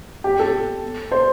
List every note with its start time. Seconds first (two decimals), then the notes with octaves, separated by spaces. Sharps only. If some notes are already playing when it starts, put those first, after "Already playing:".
0.24 G4
0.40 A4
1.12 C5